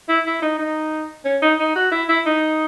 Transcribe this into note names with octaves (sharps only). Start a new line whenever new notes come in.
E4
E4
D#4
D#4
C#4
D#4
D#4
F#4
E4
E4
D#4